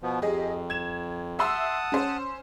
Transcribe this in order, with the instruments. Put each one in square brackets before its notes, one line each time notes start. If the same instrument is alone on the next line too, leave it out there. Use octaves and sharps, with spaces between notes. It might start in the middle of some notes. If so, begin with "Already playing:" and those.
[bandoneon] B2 F3 B3
[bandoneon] F2 [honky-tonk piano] G4 G#4 D#5
[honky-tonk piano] G#6 E7
[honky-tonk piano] E5 C6 E6 [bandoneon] F#5 A5 D#6
[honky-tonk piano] C#4 C5